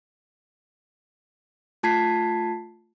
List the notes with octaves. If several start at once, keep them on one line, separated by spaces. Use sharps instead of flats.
A3 F4 A5 G#6 B6 C7